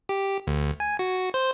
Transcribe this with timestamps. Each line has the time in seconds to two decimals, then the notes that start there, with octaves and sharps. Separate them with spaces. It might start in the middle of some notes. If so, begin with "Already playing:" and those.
0.09 G4
0.47 D2
0.80 G#5
0.99 F#4
1.34 C5